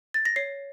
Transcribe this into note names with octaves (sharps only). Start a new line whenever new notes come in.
A6
A#6
C#5 C7